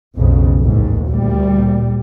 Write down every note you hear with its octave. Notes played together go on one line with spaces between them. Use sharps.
B1 F2 C#3
A1 D#2 G#2
D2 A#2 G3